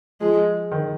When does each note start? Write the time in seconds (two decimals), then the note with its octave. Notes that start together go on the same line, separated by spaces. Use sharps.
0.21 F3 G#3
0.72 D#3